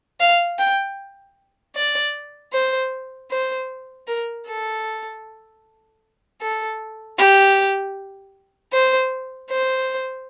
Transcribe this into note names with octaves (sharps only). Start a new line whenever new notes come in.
F5
G5
D5
C5
C5
A#4
A4
A4
G4
C5
C5